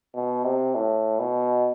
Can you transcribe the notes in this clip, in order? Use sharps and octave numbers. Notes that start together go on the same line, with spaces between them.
B2
C3
A2
B2